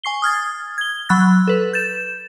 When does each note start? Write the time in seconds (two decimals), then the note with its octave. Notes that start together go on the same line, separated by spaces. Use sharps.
0.04 G#5 C#6 C7 G7
0.22 D#6 F6 G#6 A6
0.78 G#6 G7
1.09 F#3 B5 E6 F#6 A6
1.48 A4 B4
1.73 G6 A6 E7